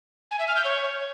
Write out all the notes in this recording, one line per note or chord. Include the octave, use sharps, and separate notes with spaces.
G#5
E5
F6
G6
C#5